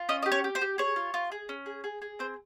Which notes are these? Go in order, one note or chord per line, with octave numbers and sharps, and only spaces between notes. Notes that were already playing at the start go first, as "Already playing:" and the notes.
Already playing: F4
C#4 D#5
G4 D#5
C#5
G4
C5
G4
G#4 C#5
F4
F4
G#4
C#4
G#4
G#4
G#4
C4 C5